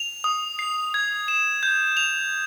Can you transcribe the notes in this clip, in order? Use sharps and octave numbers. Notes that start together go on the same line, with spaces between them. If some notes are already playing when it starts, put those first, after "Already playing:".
Already playing: F7
D#6
C7
G#6
E7
G6
F7